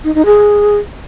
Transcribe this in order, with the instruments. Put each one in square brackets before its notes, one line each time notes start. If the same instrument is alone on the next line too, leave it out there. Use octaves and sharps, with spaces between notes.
[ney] D#4
D#4
G#4